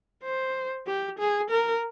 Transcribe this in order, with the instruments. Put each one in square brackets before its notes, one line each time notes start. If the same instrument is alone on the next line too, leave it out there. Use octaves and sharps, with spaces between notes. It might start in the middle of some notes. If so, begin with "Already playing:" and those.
[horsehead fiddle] C5
G4
G#4
A#4